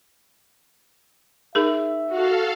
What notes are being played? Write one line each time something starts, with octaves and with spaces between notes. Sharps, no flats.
D#4 G#4 A#4 E5
F#4 A4 F5